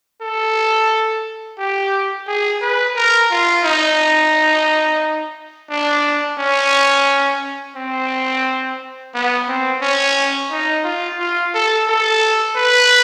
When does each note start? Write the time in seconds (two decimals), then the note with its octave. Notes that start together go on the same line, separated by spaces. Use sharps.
0.22 A4
1.59 G4
2.27 G#4
2.62 B4
2.96 A#4
3.31 F4
3.65 D#4
5.70 D4
6.39 C#4
7.77 C4
9.14 B3
9.48 C4
9.82 C#4
10.51 D#4
10.84 F4
11.20 F4
11.54 A4
11.88 A4
12.57 B4